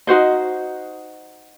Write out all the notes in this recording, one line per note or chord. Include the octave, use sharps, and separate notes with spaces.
D#4 F#4 C5 D#5